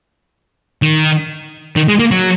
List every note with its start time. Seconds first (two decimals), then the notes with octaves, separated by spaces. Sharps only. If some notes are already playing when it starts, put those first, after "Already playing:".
0.82 D#3
1.76 D#3
1.88 G#3
1.99 A#3
2.11 F#3